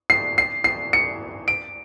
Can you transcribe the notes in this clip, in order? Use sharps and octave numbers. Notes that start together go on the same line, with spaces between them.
C7
C7
C7
C#7
D7